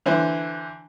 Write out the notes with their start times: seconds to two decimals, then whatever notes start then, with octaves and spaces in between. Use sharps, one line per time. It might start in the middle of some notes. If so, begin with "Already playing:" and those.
0.06 D3 E3 C5